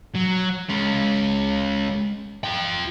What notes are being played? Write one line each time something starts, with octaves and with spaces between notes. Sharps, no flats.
F#3
G#3 C#4
F4 G5